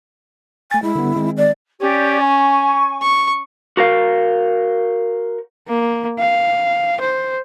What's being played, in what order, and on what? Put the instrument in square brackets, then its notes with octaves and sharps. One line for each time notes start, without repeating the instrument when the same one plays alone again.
[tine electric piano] A3 A6 [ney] G#5
[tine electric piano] G#3 [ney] E4
[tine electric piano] D3 G3 B3
D#3 G#3 C4
[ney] D5
[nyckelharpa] C#4 [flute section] G4 D5
[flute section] G#5 C#6
[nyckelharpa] C#6
[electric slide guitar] F#4 A#4 C5 F5
[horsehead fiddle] A#3
F5
C5